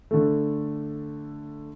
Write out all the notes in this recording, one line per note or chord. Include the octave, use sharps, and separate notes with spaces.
D3 A3